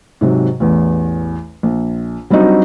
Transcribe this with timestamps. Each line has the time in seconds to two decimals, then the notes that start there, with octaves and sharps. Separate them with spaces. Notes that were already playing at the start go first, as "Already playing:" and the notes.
0.21 G#2 C3 F#3
0.60 A1 E2
1.63 A#1
2.30 F#3 G3 C4 D4 D#4 F#4